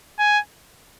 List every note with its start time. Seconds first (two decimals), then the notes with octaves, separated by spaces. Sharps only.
0.19 G#5